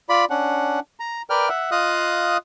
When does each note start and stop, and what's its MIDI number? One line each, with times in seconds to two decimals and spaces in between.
0.09 0.25 65
0.09 0.25 74
0.09 0.25 83
0.30 0.80 61
0.30 0.80 62
0.30 0.80 78
1.00 1.22 82
1.30 1.49 70
1.30 1.49 71
1.30 1.49 74
1.30 1.49 79
1.30 1.49 89
1.49 1.70 76
1.49 1.70 78
1.71 2.37 65
1.71 2.37 75
1.71 2.37 77
1.71 2.37 87
1.71 2.37 90